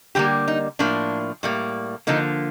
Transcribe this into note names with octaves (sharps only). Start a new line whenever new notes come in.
D3 G3 A#3 G4
D#4
A2 F3 A#3 D4
A2 G3 A#3
D3 F3 A#3 D#4